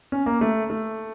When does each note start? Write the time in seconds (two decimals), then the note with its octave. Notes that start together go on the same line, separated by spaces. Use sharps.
0.12 C#4
0.26 A#3
0.41 A3
0.70 A3